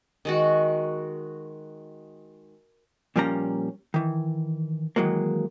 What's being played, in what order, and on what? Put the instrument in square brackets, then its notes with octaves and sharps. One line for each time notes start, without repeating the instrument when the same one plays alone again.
[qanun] D#3 G#3 F#4
[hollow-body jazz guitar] A#2 F3 G3 A#3 C#4 A#5
D#3 E3
D#3 E3 F#3 G#3 A#3